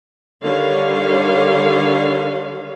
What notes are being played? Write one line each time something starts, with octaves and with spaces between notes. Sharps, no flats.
D3 D#3 G3 C#5 F5